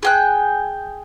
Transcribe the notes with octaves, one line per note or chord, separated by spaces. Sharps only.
G#4 G5 F#6